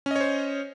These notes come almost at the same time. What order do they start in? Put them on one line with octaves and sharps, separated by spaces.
C#4 D#5 C#5 C5